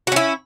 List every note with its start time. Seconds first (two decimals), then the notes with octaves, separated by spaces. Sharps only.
0.07 F#4
0.12 C#4
0.16 E4